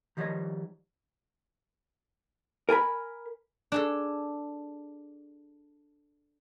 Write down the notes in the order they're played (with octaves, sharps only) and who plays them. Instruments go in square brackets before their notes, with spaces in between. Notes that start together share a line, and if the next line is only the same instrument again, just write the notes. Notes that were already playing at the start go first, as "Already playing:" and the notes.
[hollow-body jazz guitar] D#3 F3 G3 G4 C#5 D#5
A#4 G#5 A#5 B5
[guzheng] D4 G#4 A4